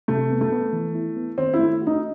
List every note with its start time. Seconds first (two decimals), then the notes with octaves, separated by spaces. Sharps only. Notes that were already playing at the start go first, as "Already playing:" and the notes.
0.08 C3 A3
0.31 B3
0.41 A3
0.52 B3
0.73 E3
0.95 E4
1.16 B3
1.38 D#3 C4
1.54 E4
1.59 A3
1.82 F#4
1.87 D#4